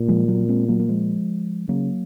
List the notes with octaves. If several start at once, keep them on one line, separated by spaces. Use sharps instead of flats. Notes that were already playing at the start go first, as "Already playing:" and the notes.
Already playing: A#2
F3 G#3
F#3 A#3
A#3
G#3 C4
F#3 A#3
A#3
F3 G#3
C#3 F#3 A#3